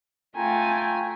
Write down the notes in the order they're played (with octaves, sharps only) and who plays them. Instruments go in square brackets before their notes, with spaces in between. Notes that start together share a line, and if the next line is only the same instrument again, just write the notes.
[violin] A3 [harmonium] F4 A#5 [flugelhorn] G5 [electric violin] G#5